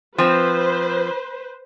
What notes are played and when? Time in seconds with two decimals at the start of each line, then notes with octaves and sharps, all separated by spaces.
0.18 F3 C4 B4 C5